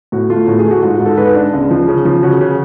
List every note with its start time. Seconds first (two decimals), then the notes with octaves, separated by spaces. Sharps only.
0.12 A2 F#4
0.30 A3 F4
0.48 A2 F#4
0.59 G#4
0.65 A3
0.71 F#4
0.82 G#2 F4
0.94 F#4
1.00 G#2
1.06 A4
1.17 G#2 B4
1.35 D4
1.53 C#2
1.70 F3
1.88 C#3
2.05 F3
2.23 C#3 F#4
2.41 C#3